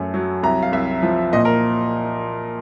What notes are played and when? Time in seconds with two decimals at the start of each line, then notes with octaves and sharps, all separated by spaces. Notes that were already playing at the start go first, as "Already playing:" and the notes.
Already playing: F#2 A3
0.14 F#3
0.43 C2 A#5
0.63 F5
0.72 C2 E5
1.02 F3
1.33 A#2 D#5
1.45 A#4